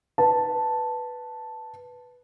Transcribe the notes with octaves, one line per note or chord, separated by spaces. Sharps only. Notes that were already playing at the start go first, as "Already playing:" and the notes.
B4 A5